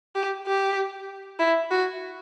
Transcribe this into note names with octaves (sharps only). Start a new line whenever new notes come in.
G4
G4
E4
F#4